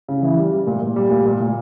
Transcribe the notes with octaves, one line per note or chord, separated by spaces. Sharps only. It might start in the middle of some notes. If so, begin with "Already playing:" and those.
C#3
E3
G3
G3
A#2
A#2
G3
A#2
A#2
A#2